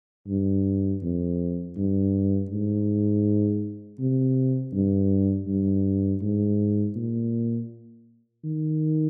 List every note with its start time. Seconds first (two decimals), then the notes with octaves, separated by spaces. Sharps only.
0.28 G2
1.02 F2
1.77 G2
2.50 G#2
3.99 C3
4.73 G2
5.47 G2
6.22 G#2
6.96 A#2
8.44 D#3